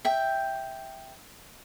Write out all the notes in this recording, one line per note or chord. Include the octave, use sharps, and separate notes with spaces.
E5 G5